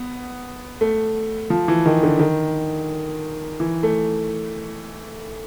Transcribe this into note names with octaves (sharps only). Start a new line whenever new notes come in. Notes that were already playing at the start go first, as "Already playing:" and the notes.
Already playing: B3
A3
F3
E3
D#3
D3
D#3
E3
A3